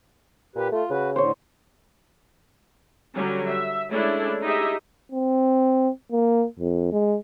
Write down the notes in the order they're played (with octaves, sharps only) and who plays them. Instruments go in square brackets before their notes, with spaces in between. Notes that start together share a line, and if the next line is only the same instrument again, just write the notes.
[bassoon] A#2 [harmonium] G4 B4
[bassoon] A3 [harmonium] F4
[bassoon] C#3 [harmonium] F#4 B4
[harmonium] A2 D3 [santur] C5 C#5
[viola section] D3 F#3 G3 C#4
E5
G#3 A3 C#4 D4 E4 A4
D#4 E4 G4 G#4 D#5 E5
[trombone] C4
A#3
F2
G#3